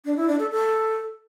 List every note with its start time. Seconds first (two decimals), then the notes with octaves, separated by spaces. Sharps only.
0.05 D4
0.17 E4
0.28 D4
0.39 A4
0.51 A4